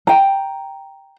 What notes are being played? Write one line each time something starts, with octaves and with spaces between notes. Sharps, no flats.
G5 A#5